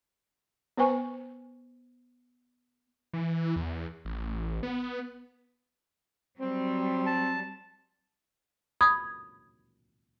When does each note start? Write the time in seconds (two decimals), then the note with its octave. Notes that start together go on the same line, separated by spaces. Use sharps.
0.77 B3 B4 C5 G5 G#5 C#6
3.13 E3
3.56 E2
4.05 A1
4.63 B3
6.40 F#3 G3 C4
7.06 A5
8.81 B5 D#6 G#6